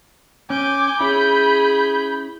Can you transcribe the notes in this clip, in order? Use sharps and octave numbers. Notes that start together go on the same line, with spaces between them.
C#4 G#5 D6 G6
C#4 E4 G#4 B5